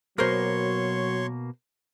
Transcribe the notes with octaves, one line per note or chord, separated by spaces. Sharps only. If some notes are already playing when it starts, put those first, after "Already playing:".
B2 F#3 A#3 A#4 C5 C#5 C6 C#6